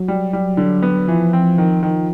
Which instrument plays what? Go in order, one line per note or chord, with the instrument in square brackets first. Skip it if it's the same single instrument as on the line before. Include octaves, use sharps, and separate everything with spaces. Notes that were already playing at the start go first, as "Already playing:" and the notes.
Already playing: [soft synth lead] F#3
[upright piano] G3
G3
D3
B3
[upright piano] E3 [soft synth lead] F3
[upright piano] C4
D#3
D#3